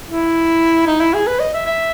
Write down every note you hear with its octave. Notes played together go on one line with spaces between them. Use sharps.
E4
D#4
E4
G#4
B4
D#5
E5
E5